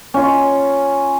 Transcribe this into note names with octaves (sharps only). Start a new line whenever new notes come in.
C#4 F4